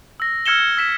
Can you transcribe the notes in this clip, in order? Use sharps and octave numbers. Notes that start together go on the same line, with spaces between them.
E6 A#6
E6 F6 G#6 C#7 E7 G7
E6 B6 E7